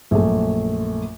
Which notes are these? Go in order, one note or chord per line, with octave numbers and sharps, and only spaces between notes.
A#1 F#2 A3